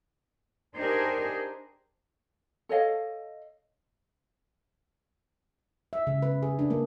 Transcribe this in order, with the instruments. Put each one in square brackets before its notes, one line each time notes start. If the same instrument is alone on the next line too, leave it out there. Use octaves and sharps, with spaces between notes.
[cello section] D4 D#4 G4 G#4 A#4 C5
[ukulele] A4 C#5 D#5 F5
[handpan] E5
C#3
B4
G#4
D4
A#3